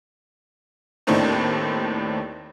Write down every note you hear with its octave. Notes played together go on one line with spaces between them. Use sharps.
D#2 A2 A3 C4 D4 D#4